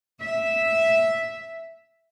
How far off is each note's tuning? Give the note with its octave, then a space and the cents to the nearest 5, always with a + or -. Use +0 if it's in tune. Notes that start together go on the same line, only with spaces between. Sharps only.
E5 -5